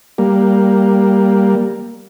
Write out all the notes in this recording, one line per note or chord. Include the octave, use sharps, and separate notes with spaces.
G3 A#3